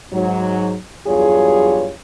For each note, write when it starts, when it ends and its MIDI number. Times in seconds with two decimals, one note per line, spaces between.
0.13 0.75 44
0.13 0.75 54
1.07 1.92 40
1.07 1.92 43
1.07 1.92 54
1.07 1.92 65
1.07 1.92 68
1.07 1.92 73